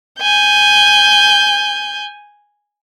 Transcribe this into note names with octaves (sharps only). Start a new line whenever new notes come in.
G#5 G6